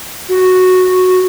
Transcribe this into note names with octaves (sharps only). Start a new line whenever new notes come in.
F#4